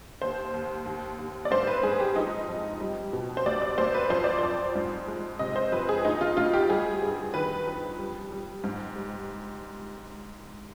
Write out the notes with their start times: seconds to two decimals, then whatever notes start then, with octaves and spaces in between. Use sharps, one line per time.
0.22 D#2 C5
0.54 D#2
0.86 D#2
1.19 D#2
1.45 D5
1.51 G#2 C5
1.67 B4
1.83 G#2 G#4
2.00 G4
2.16 F2 D#4
2.49 F2
2.81 G3
3.13 B2
3.37 C5
3.46 D2 D5
3.62 D5
3.78 D2 C5
3.94 B4
4.10 F2 C5
4.24 D5
4.38 F2 C5
4.75 G#2
5.08 G#3
5.39 C3 D#5
5.56 C5
5.72 F2 B4
5.89 G#4
6.05 D2 D#4
6.21 F4
6.37 D2 F4
6.53 G4
6.69 G3 G#4
7.02 G2
7.34 D#3 B4
7.67 F2
7.99 G3
8.32 G3
8.64 G#2
8.96 G3